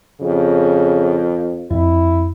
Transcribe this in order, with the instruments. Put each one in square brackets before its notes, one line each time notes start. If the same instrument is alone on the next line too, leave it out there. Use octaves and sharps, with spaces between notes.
[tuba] F2 [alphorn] C#3
[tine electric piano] F2 [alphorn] E4